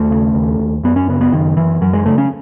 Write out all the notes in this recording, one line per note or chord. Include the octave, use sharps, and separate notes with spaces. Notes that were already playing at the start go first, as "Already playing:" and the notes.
Already playing: D#2 A3
C#3
D#2
D#2
F#2 B3
C#4
C#3 B3
B3
F#2 D#3
F#2 E3
F#2 F#3
G#3
C#3 A3
C#4